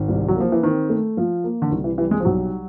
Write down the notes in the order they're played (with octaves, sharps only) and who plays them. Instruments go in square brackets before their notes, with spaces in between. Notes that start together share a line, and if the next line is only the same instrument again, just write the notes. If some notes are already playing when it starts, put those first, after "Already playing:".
Already playing: [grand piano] G#1
C2
[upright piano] F#3
[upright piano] F3 [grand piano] A#3
[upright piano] E3
[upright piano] D#3 [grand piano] C4
[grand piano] A3
F3
A#3
[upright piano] D3
[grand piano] C2 [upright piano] D#3
[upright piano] E3
[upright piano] E3 [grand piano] G3
[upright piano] G#3
F3
[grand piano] B1 [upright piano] F#3